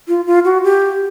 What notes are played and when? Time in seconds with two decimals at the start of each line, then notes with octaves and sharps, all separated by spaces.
0.08 F4
0.26 F4
0.45 F#4
0.64 G4